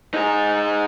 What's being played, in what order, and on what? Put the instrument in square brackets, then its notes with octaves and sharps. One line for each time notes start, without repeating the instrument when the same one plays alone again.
[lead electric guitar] D#4 G#4